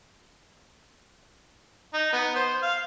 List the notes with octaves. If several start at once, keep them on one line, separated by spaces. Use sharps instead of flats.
D#4
B3
C5
F5